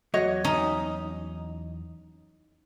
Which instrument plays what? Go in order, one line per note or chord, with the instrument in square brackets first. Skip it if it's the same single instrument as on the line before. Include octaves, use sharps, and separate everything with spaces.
[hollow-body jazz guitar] E2 F#3 [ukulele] F#4 C#5 D#5
[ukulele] C#4 [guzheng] D#4